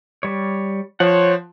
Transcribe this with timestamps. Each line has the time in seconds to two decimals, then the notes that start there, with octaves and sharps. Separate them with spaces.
0.23 G3 C#5
1.00 F3 C5 C#5 F#5